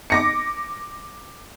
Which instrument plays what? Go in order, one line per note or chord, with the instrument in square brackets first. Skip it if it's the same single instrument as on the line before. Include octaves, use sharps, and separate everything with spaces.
[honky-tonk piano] D6 A#6 C#7